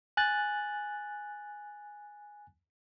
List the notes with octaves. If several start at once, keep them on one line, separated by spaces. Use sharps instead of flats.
G#5 F#6 A6